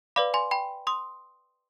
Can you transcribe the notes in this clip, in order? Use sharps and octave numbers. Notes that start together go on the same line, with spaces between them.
B4 D5 F5 B5 D6
G#5 C6
G5 B5
C6 D#6